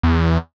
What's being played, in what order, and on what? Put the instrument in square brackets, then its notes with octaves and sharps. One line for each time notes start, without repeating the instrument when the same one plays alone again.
[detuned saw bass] E2